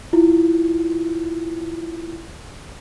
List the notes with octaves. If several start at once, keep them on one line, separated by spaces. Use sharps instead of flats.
E4 F4